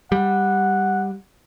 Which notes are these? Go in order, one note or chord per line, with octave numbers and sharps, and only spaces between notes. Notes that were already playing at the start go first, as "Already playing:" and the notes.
G3 F#5